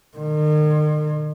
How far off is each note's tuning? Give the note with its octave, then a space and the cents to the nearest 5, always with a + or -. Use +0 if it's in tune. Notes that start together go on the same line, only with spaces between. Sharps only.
D#3 -40